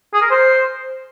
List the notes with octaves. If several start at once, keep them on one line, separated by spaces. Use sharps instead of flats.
G#4
A#4
C5